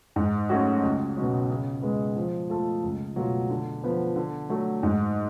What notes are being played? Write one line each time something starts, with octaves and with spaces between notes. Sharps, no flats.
G#2
F#3 A3 C#4 F#4
C#2
B2 F#3 C#4
C#3
G#3 B3
F3
A3 F4 A4
C#2
B2 F#3 A3 F4
D3
F3 B3
D3
F#3 A3
G#2